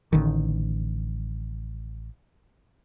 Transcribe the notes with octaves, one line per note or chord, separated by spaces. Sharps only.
A1 D3 D#3